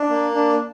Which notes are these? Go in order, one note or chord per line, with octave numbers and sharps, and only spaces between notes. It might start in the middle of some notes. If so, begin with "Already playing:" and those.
Already playing: D4
A#3
D4